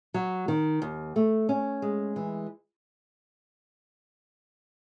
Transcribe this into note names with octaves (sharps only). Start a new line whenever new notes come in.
F#3
D#3
D#2
A3
C#4
G#3
E3